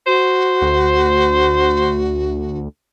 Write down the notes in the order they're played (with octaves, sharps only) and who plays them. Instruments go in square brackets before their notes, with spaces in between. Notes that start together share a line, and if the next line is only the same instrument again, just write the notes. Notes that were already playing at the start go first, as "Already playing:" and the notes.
[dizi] F#4 [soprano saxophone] C5
[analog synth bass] D2